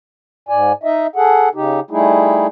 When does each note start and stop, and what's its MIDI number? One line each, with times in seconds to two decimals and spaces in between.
0.49 0.72 44
0.49 0.72 74
0.49 0.72 80
0.83 1.07 63
0.83 1.07 75
0.83 1.07 76
1.16 1.49 68
1.16 1.49 69
1.16 1.49 78
1.55 1.80 49
1.55 1.80 63
1.55 1.80 67
1.91 2.47 55
1.91 2.47 57
1.91 2.47 63
1.91 2.47 64
1.91 2.47 68